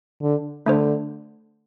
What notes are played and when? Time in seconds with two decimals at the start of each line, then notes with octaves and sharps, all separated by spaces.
0.22 D3
0.66 D3 A3 D4 C5